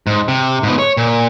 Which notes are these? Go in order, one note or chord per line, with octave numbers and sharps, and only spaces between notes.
G#2
C3
G#2 B3
C#5
A#2